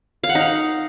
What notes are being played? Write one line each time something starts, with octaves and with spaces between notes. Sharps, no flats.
F5
F#5
D#4
F5